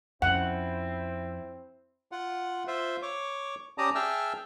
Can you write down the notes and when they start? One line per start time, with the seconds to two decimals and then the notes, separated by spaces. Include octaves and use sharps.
0.22 F2 C4 C#4 E4 F#5
2.12 F4 F#5
2.67 F4 C5 E5
3.02 C#5 C#6 D6
3.78 C#4 G4 D5 A5 A#5 D#6
3.95 G#4 E5 G5 A5 E6 F6